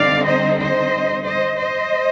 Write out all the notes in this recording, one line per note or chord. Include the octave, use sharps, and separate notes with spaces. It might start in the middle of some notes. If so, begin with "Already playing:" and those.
Already playing: D3 G3 C4 D#4 D5 F5
C5 D#5
C5 D#5
C5 D#5
C5 D#5